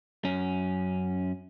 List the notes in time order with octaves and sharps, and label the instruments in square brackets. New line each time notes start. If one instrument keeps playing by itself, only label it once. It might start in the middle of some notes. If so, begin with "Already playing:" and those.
[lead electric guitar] F#2 C#4